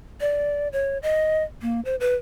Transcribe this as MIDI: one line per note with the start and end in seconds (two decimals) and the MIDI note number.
0.21 0.68 74
0.73 0.98 73
1.03 1.43 75
1.62 1.80 58
1.85 1.96 72
2.00 2.15 71